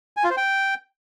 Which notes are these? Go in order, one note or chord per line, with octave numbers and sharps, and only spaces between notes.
G#5
F4
C5
G5